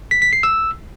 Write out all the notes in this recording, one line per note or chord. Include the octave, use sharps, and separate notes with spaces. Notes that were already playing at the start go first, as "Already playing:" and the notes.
B6
B6
C7
E6